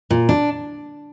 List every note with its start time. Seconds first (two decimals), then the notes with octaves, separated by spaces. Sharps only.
0.10 A#2
0.29 D4